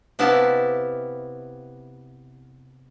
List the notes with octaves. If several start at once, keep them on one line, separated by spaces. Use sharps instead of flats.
C3 B3 E4 G4 F5 A5